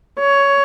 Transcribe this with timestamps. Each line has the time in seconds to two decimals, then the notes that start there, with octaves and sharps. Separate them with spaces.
0.20 C#5